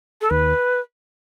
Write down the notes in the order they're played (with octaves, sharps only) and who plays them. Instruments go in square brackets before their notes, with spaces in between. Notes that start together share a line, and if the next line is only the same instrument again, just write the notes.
[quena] A4
[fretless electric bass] D#2 [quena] B4